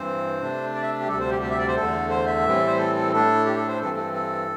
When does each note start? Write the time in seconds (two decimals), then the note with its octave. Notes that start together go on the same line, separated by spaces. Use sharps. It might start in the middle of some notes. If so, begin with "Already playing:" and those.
Already playing: G2 E3 C4 C5
0.40 C3 A3 D4
0.74 D5
0.82 E5
1.00 G4
1.08 D2 C3 G3 A4
1.20 C5
1.31 G4
1.42 G4
1.50 E5
1.59 D5
1.68 C5
1.76 E2 D3 A3 A4
2.10 C5
2.27 E5
2.44 A2 E3 G3 C4
2.67 C5
2.78 A4
2.95 A4
3.12 A2 A3 D4 A4
3.46 G4
3.57 A4
3.68 C5
3.80 G2 E3 C4 A4
3.97 A4
4.14 A4